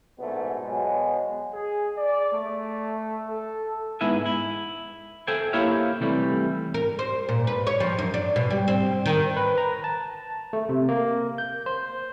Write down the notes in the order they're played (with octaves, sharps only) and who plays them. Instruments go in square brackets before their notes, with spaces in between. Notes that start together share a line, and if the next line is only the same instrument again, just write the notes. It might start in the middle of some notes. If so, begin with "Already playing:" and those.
[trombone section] A#1 G#2 B2 A3 B3
B2 F#3 G#3
[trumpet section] G#4
D5
A3
A4
[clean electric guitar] G#2 B3 E4 E5 G#5
E4
A4 C5 E5 G5 G#5
A#3 E4 G4 C#5 E5 F5
C3 E3 G3 A3
[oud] A#4
C5
A#2
B4
C#5
F3
F#2
D4
B2
G3
C4
D#3
[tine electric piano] B4
A#5
A5
A3
C3
A#3
G6
C5